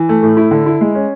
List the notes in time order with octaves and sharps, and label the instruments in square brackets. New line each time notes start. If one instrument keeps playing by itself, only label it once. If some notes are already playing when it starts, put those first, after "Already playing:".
Already playing: [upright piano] E3
A3
A2
E4
D3
E4
G#3
C#4